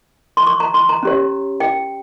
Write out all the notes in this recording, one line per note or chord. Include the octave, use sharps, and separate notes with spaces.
C6
C#6
A#5
C6
A#5
C#4 G4 C#5
G5